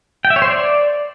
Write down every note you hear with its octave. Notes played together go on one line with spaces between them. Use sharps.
G5
E5
C#5
C5
D5